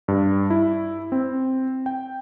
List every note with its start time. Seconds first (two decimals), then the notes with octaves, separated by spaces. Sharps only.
0.08 G2
0.50 E4
1.12 C4
1.86 G5